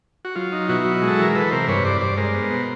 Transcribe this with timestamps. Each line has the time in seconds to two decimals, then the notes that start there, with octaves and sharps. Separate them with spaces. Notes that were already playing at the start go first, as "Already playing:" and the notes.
0.25 F#4
0.36 F#3 F4
0.52 D#4
0.69 B2 E4 F#4
0.85 F#3
1.02 G#3
1.08 A4
1.19 E3 A#4
1.35 E3 A4 B4
1.51 C3 A#4 C5
1.68 G2 B4 C#5
1.84 G2 C5 D5
2.01 G2 C5 D5
2.17 G#3 A#4 C5
2.34 B3
2.51 B2